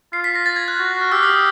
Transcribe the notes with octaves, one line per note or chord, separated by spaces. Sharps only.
F4 C7
B6
A#6
A6
G#6
F#6
F#4
F6
G4 E6
D#6